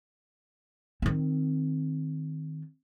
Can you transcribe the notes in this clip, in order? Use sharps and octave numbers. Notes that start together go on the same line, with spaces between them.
D#3 C4